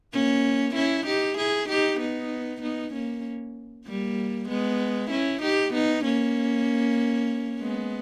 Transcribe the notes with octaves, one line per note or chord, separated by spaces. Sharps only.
A#3 C#4
C#4 E4
D#4 G4
E4 G#4
D#4 G4
B3 D#4
B3 D#4
A#3 C#4
G3 A#3
G#3 B3
C#4 E4
D#4 G4
B3 D#4
A#3 C#4
G#3 B3